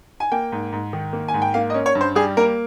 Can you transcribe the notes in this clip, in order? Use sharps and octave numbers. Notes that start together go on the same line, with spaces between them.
G#5
A#3 G5
G#2
G#2
D#3
A#3
G#5
G#2
G5
A#3 F5
D#5
C#4
C#5
G2
C5
G3 G#4
A#3 A#4